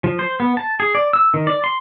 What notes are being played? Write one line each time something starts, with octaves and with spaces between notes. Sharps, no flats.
F3
C5
B3
A5
G#4
D5
E6
D#3
D5
C6